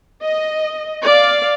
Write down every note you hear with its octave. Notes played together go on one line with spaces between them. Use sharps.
D#5
D5 F5